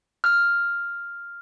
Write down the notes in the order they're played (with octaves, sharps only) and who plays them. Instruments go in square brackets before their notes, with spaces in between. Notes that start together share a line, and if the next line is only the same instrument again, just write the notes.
[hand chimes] F6